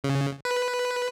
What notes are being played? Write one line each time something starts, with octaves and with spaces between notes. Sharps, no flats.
C#3
B4